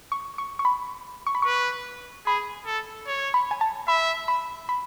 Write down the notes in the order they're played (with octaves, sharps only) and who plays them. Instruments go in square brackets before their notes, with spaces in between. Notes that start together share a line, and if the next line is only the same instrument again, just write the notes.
[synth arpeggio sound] C#6
C#6
C#6
B5
C#6
B5
[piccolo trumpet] B4 [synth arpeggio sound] C#6
[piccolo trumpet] G#4 [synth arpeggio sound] B5
[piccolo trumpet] A4
C#5
[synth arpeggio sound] B5
G#5
A5
[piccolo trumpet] E5 [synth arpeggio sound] B5
[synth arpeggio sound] B5
B5